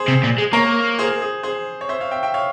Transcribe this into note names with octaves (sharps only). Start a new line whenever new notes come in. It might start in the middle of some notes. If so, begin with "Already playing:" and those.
Already playing: G#4 C5
C3
A#2
G#3
A#3 A#4 C#5
G#4 C5
G#4
G#4 C5
C#5
C5 E5
C#5 F5
E5 G5
E5 G5
C#5 F5